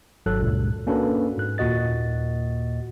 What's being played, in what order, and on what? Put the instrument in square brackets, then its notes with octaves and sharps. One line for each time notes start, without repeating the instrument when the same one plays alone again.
[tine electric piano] G#1 G#2 F#3 A4 F#6
C#2 G2 A#2
A#3 C#4 D4 F#4 A4 B4
G#2 F#6
D#2 A#2 F#4 D#5 A6